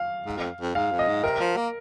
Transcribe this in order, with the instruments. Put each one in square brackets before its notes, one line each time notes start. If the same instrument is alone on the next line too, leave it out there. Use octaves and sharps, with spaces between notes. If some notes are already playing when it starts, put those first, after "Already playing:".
Already playing: [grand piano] F5
[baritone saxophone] G#2
F2
F2
[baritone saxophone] G#2 [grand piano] F5
[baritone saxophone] F2
[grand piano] D#5
[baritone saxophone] G#2
[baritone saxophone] C3 [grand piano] A#4
[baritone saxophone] F3
A#3